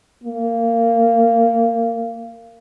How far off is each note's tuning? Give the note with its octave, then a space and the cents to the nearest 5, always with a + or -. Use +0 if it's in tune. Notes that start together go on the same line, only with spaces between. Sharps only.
A#3 -20